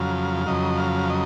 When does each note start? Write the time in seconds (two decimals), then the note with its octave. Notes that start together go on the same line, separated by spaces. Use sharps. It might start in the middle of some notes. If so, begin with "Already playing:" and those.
Already playing: F2 C#3 F#3 F5
0.46 F2 C#3 F#3 D#5
0.78 F5
1.10 D#5